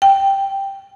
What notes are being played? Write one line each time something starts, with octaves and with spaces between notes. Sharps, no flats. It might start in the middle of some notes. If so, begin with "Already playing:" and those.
G5